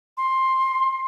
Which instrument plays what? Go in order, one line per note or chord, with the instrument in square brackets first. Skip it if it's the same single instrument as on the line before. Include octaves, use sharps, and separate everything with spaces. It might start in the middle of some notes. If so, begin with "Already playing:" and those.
[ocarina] C6